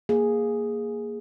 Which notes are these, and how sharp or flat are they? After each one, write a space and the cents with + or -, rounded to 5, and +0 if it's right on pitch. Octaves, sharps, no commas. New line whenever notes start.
A#3 +0 G#4 +0